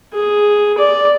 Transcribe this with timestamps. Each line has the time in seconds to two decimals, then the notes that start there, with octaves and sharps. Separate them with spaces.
0.14 G#4
0.78 D5